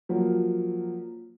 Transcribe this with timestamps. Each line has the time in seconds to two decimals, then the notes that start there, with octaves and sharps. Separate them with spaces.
0.09 F3 F#3 A#3